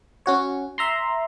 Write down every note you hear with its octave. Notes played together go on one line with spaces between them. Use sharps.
C#4 F#4 C#5
E5 A#5 C6